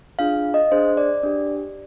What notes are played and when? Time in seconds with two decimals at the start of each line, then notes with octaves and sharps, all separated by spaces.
0.19 D4 F4 G#4 F5
0.54 D#5
0.72 D4 G#4 C5
0.97 D5
1.23 D4 G4